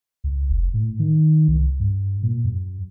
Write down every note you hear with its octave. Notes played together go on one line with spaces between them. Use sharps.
C#2
F1
A2
D#3
C2
G2
A#2
F#2